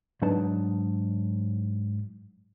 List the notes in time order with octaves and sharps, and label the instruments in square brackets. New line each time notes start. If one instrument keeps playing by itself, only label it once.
[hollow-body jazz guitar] G#2 F#3 D4 D#4 B4 A5